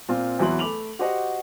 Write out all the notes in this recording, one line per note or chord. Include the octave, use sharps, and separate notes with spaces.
A#2 C4 F4
E2 E3 F#3 C6 F#7
A3 B5 D6 F7 F#7
F#4 G4 C5 D#5 F#5